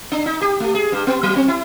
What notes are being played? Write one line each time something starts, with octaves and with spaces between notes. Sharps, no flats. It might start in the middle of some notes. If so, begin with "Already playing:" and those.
D4
D#4
G4
A3
G#4
G2
B3
F#3
C4
E4